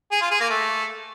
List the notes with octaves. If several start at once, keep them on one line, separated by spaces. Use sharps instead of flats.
G#4
F4
G#4
A#3
A3